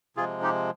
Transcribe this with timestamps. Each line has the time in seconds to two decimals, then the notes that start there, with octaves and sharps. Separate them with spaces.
0.16 C3 F3 G#3 F4 G#4
0.42 D#4 G4